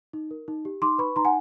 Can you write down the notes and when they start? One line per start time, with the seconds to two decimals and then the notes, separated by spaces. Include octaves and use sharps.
0.13 D#4
0.31 A#4
0.48 D#4
0.65 G4
0.82 D#4 C6 D6
0.98 B4 B5 C#6
1.16 D#4 A#5 C6
1.25 F#5 G#5